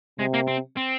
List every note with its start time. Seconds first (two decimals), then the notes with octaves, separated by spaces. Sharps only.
0.19 C3 G#3
0.34 A#3
0.48 C4
0.77 C4